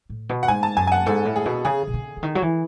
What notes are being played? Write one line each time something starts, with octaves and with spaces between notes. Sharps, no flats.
A2
B2
F#5
G#2 G#5
A5
F#2 G#5
G#5
F#5
G#2 A4
A2
G#4
B2
C#3 G#4
B2
C#3
C#3
D#3
F#3
E3